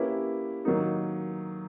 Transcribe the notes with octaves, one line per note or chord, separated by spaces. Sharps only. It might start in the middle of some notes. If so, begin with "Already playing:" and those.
Already playing: A#3 C#4 E4 G4 B4
D#3 F#3 A#3 D#4